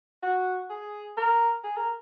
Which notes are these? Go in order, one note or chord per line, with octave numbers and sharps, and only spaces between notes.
F#4
G#4
A#4
G#4
A#4